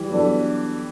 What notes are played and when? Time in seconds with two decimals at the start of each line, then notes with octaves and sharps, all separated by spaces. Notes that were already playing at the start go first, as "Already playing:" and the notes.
Already playing: E3 G3
0.10 F#3 B3 D4 A4